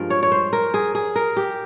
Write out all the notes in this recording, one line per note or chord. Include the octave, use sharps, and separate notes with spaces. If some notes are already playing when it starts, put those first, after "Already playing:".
Already playing: G2 F3 G#3 A#4
C#5
C#5
C5
A#4
G#4
G#4
A#4
G4